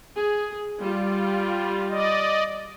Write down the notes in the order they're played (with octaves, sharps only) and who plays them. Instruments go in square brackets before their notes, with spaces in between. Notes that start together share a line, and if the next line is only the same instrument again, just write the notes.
[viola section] G#4
G3 F4
[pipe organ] D5 D#5